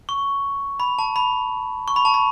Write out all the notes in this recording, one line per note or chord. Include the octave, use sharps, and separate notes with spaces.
C#6
B5
A5
B5
C#6
B5
A5
B5